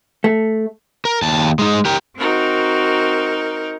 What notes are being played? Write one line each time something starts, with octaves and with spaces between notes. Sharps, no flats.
A3
A#4
D#2 A5
G#3 D#4
G4 A#4
C4 D#4 F#4 A#4